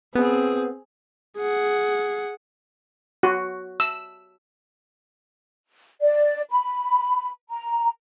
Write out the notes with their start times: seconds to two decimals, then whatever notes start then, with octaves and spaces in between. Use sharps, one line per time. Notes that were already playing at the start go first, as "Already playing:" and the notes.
0.15 B3 C4 G#4
1.37 G#4 F#5
3.23 F#4
3.80 E6
6.02 D5
6.51 B5
7.50 A#5